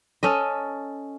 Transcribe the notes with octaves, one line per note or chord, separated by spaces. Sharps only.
C#4 A4 D#5